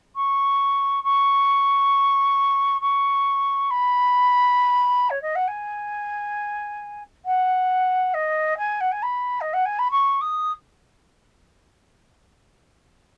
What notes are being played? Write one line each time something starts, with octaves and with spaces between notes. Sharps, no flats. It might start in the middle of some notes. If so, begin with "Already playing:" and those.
C#6
C#6
C#6
B5
C#5
D#5
F#5
G#5
F#5
D#5
G#5
F#5
G#5
B5
D#5
F#5
G#5
B5
C#6
D#6